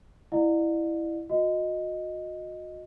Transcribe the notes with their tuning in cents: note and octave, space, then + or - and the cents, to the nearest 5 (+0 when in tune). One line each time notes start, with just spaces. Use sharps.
E4 +0 D5 +40 F5 +35
F#4 -35 D#5 +0